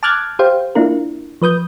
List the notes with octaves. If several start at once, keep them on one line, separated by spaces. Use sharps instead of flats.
A5 D6 F6 F#6 G#6 A6
G4 C5 F5 G5
A#3 D4 E4 F4 A#4
F3 B4 D#6 G6